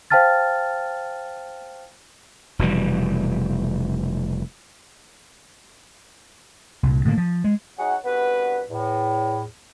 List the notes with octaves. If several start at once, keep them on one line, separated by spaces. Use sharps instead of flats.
C5 F5 G5 A5 F6 A6
F1 B2 E3 G3
C2 A#2
A2 D3 E3 A#3
F3
G#3
F#3 D#4 G#4 C#5 F#5
C2 G2 B3 F#4 B4
E2 A2